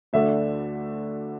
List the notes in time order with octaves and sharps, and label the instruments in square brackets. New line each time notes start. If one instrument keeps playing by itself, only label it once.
[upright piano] D2 D3 A3 D4 E5